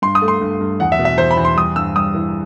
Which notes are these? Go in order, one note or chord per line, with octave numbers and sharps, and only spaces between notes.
G2 C6
D#6
A3
C6
G2
G2
E2 F#5
E5
B2
E5
E2 C5
B5
E2
C6
G3 D#6
G2 E6
G3 D#6
E3